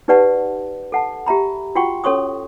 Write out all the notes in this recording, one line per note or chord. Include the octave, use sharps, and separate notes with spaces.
D#4 G4 B4 D5 F#5 A5
A4 F#5 A5
G4 E5 A#5 B5
F4 F#4 F#5 G5 C6 C#6
C#4 A4 C#5 C6 C#6 D#6